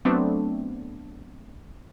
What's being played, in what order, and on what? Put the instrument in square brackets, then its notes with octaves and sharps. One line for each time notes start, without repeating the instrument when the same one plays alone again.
[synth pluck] F#3 A3 B3 C4 D4